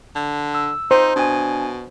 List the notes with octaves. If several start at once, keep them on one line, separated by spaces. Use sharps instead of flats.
D3
E6
D#4 C5
B2 D4 G#5